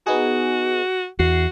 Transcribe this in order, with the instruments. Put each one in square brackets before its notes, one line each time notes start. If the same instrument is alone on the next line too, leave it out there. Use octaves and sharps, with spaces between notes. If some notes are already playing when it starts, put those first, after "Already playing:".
[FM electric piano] B3 D#4 G#4 [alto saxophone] F#4
[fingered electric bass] E2 [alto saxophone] F#4 [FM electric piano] C7